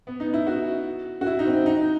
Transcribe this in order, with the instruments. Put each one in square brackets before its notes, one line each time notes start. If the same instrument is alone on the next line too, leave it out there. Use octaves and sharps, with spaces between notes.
[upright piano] B3
D#4
E4
F#4
F#4
E4
D#4
C4
D#4